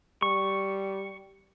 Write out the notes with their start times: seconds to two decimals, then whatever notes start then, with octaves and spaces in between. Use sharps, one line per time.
0.22 G3 C#6